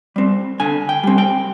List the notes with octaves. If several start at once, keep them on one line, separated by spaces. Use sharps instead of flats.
G3 C4
D3 G#5
G5
G3 C4
G5